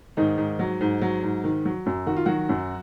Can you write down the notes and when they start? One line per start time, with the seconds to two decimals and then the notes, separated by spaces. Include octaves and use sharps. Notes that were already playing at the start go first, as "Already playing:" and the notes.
0.17 G#2 D#3 D#4
0.38 G#2
0.59 F#3
0.81 G#2
1.01 F#3
1.23 G#2
1.44 D#3
1.65 F#3
1.86 F#2
2.06 D#3 F#4
2.16 F4
2.26 D#3 F#3 F#4
2.49 F#2